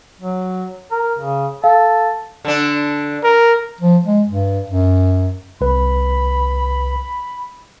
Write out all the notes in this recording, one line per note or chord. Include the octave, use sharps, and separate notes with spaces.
F#3
A#4
C#3
A4 F5
D3 D4
A#4
F3
G#3
G2
F#2
C2 B4 B5